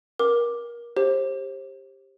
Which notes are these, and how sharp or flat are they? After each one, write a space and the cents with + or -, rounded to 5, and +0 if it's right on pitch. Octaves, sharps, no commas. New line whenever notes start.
A#4 +25 D6 +0
G4 +10 C5 +35